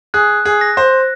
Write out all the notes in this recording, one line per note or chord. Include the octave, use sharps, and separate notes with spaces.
G#4 F#6
G#4
A#6
C5